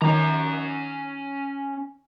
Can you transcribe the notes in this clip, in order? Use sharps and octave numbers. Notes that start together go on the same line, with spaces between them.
D#3 C#4 A#5